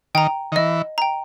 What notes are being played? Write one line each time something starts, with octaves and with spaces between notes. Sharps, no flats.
D#3 G5 A#5
D#3
E3 D#5
G5 A#5